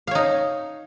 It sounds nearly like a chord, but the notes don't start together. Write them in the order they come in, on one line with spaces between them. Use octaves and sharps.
F5 C#5 D#4